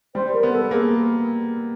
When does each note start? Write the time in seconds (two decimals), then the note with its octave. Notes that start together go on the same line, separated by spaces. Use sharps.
0.15 G3 C5
0.33 A#4
0.43 B3
0.52 A4
0.71 A#3 G#4